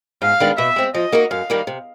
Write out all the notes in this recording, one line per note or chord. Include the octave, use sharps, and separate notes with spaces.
G#2 F5
D#3 G#3 B3 D4
B2 E5
G#3 C4
F3 D#5
A#3 D#4 F#4 A#4
F#2 F5
D#3 G3 A#3
C3